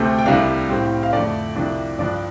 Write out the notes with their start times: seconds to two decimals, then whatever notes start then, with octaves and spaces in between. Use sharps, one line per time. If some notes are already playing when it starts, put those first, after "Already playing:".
Already playing: D2 C3 A3 C4 G5
0.19 G5
0.26 C2 C3 G3 D4 F5
0.69 A2 G3 C4
1.03 F5
1.13 F2 D3 A3 D5
1.55 C2 C3 F3 D4
1.99 G2 F3 D4 D5